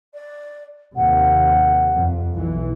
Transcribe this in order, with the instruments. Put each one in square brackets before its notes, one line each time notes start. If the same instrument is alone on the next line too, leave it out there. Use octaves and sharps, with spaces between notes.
[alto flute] D5
[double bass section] D#2 C3 [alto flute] F#5
[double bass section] F2
B1 E3